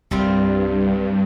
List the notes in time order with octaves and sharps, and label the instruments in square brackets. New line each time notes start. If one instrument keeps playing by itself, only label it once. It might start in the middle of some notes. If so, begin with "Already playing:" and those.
[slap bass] C2 C3 [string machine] G2 [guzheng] G3 C4 F4